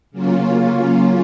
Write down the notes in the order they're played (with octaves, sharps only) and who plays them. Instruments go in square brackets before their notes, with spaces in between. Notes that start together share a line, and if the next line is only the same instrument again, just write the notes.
[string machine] C#3 F#3 A#3 C#4 F4